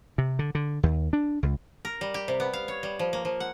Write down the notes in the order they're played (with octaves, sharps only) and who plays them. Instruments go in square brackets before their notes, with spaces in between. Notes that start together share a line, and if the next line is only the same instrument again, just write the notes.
[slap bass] C3
D3
D3
D#2
D4
C#2
[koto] A#4
G3
G4
C3
B3
F5
C#5
G3
F3
A#3
F3
F#5